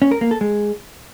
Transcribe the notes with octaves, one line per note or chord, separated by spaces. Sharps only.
C#4
A#4
A#3
A4
G#3